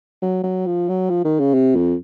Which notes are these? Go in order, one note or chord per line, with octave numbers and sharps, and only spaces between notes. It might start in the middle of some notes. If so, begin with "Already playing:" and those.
F#3
F#3
F3
F#3
F3
D#3
C#3
C3
F2